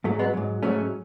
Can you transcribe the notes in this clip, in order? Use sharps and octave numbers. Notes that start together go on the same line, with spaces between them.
G#2 F#3 A3
G#3 B3
G#2 F#3
G#2 F#3 A3 C#4